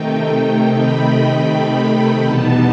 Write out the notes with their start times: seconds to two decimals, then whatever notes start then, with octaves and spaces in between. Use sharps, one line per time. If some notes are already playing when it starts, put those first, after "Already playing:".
Already playing: C3 D#3 A3 D#4 G5
0.76 B5
1.13 B5
2.22 E2 B2 G3 B3 D#4 A5